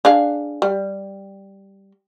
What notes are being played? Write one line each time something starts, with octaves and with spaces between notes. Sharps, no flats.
D4 G#4 F5
G3